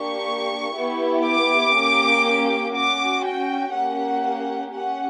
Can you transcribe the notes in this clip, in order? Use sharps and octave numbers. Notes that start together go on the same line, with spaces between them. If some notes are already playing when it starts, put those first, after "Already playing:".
Already playing: A#3 D4 G4 C#6
B3 E4 G4
D6
A#3 C#4 G4
C#4 F#4 D6
G5
A#3 C#4 G4 F#5
C#4 G4 F#5